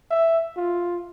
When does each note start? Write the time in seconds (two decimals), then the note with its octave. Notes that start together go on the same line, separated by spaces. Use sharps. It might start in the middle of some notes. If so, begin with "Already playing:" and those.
0.11 E5
0.57 F4